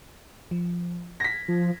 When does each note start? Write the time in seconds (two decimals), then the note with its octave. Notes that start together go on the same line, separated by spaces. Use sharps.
0.51 F3
1.20 G#6 A#6 B6
1.48 F3